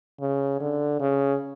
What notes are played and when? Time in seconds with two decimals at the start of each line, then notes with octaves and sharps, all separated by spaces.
0.20 C#3
0.60 D3
1.00 C#3